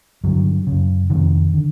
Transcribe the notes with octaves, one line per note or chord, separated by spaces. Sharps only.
G2 D3 F#3
F#2 C#3
F2 C3 D#3
D3